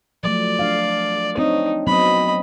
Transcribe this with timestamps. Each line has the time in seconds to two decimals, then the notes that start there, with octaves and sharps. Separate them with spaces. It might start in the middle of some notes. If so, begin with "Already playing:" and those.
0.24 F3 F#3 A3 D5
0.59 D4 F5
1.38 C4 D4 D#4 C#5
1.87 F#3 B3 C4 D#5 B5